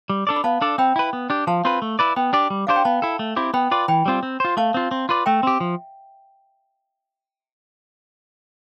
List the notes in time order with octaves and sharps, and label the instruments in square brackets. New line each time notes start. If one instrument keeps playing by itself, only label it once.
[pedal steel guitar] G3
D4 A4 D5
[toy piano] B5
[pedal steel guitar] B3 [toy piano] F5 A5
[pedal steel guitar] D4 A4 D5
[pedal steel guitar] C4 [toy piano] G5 B5
[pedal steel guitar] E4 B4
B3
D4 G4
[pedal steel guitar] F3 [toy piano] F5 A5
[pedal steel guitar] C4 F4 B4
A3
E4 B4 D5
[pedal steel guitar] B3 [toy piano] G5 B5
[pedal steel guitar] D4 G4 D5
G3
[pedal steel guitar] D4 G4 C5 [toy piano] F5
[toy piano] G5
[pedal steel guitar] B3 [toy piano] F5 A5
[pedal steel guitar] E4 A4
A3
C4 E4 G4
[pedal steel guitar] B3 [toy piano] G5 B5
[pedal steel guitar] F4 B4 D5
[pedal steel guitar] E3 [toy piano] G5 B5
[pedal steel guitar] G3 C4 F4
C4
F4 C5
[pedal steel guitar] A3 [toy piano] F5 A5
[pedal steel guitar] C4 F4
C4
F4 B4 D5
[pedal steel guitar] A3 [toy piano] E5 G5
[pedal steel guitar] C4 G4
F3